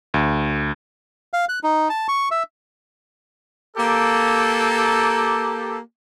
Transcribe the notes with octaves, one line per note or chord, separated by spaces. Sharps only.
D2
F5
F#6
D#4
A5
C#6
E5
A#3 G4 A4